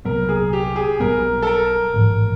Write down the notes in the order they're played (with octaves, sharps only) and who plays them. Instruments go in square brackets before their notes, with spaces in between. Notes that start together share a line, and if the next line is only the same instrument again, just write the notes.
[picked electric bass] C2 A#2 F#3 B3 [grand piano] A#4
[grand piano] G#4
G4
G#4
[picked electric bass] B1 B2 G3 B3 [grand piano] A#4
[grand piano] A4
A#4
[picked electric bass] A1 G#2 F3